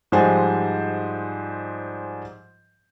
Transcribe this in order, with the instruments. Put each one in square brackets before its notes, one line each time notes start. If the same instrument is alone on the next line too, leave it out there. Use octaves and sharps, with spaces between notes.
[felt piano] G#2 F3 G3 G#3 C5 G#5